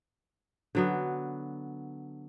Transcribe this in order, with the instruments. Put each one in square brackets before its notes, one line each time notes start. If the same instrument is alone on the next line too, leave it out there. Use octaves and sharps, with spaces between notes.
[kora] D3 F#3 B3